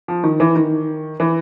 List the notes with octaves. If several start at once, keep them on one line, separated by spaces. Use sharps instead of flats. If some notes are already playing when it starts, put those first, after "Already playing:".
F3
D#3
E3
D#3
E3